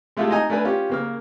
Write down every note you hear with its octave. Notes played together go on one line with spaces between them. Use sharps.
G#3 A3 E4 F4 G4 A4
D#4 D#5 G#5 A#5
A3 D4 A#4 B4 G#5
C#4 F4 G4
C#3 A#3 F6